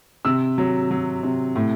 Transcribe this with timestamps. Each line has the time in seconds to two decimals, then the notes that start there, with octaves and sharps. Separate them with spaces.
0.25 C3 E6
0.58 F#3
0.91 F#3
1.23 C3
1.55 A2